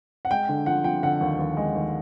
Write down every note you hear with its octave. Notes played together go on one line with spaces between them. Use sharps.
F#5
G#3 G5
D3
F3 F#5
F3 G5
D3 F#5
D#2
D#2
G#3
D#2